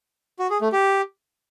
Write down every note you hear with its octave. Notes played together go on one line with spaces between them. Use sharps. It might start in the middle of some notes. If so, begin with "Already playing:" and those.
F#4
G#4
A3
G4